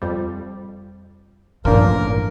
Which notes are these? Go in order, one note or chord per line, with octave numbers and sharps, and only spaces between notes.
F2 G3
A1 G2 A#2 F3 A#3 D4 A#4